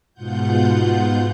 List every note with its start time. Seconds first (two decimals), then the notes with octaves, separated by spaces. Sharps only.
0.14 G#2 B2 F4 F#5 G6